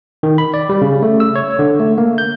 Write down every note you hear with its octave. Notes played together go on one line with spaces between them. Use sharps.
D#3
B5
D5
G3
C#3
A3
E6
C#5
D3
A3
A#3
G6